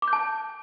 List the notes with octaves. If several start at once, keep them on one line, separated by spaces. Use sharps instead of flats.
D6
G6
A5